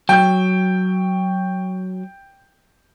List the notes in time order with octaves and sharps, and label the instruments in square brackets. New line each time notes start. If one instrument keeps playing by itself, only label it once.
[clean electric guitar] F#3 [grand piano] G5 G6